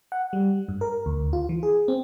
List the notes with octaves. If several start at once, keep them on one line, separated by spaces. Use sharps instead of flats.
F#5
G3
G2
A#4
D2
F4
E3
G#4
C4